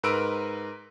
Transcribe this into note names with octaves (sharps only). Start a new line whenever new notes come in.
G#2 A#4 B4 A#5 E6 D7